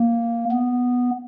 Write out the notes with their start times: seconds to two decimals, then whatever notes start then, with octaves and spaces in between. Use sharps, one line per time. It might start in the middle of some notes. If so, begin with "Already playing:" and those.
Already playing: A#3
0.51 B3